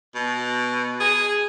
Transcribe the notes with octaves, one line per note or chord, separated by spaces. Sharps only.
B2
G#4